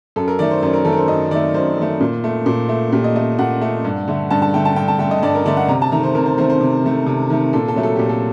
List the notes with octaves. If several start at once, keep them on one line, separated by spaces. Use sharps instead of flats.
F#2 A4
A#4
D#3 A3 D5
C5
F#2 C5
A#4
D#3 A3 A4
A#4
C5
F#2 D#5
D#3 A3 D5
F#2 C5
D#3 A3
A#2
A3
A#2
A3
A#2 G4
D#5
A3 D#5
A#2 F#5
A3
G2
D3 A3
G2 A5
A5
D3 A3 G5
A5
G2 G5
A5
D3 A3 G5
D#5
G2 D5
A#4
D3 A3 D5
F#5
C3 A#5
A5
D#3 A3 A#5
C5
C3 A#4
C5
D#3 A3 C5
C5
C3
D#3 A3
C3
D#3 A3
A#2 A4
A4
F#3 A3
A4
A#2 G4
A4